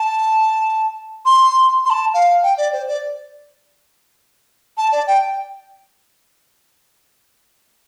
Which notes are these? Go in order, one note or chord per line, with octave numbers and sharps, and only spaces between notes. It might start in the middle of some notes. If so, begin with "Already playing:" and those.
Already playing: A5
C6
C6
A5
F5
G5
D5
C5
D5
A5
D5
G5